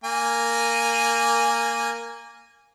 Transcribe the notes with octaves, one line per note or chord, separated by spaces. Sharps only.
A#3 G#5